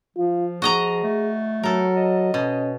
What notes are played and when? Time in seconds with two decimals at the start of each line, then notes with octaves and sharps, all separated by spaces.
0.17 F3 F4
0.62 F#4 G#4 D#5 A#5
1.04 A3
1.63 F#3 A4 A#4
1.97 D#5
2.34 B2 C#4